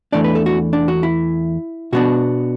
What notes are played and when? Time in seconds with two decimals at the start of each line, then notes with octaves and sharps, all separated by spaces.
0.12 E2 E3 A3 D4 D5
0.24 B4
0.35 A4
0.46 F#4
0.73 D4
0.88 F#4
1.03 E4
1.93 B2 B3 D4 F#4